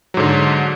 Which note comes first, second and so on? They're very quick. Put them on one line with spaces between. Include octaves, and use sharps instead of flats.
F#3 G#2 D3